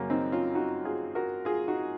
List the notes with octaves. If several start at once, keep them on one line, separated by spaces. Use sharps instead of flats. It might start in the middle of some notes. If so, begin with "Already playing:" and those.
Already playing: F#2 C#3 A#3 C#4
C4 D#4
C#4 F4
D#4 F#4
F4 G#4
F#4 A#4
F4 G#4
D#4 F#4